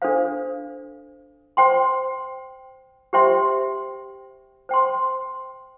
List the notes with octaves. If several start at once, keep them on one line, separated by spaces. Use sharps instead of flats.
D4 A4 C5 F5
C5 G5 C6
G4 C5 E5 G5 C6
C5 G5 C6